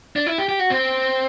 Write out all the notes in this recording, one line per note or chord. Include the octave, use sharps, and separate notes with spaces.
D4
E4
G4
G4
F#4
C4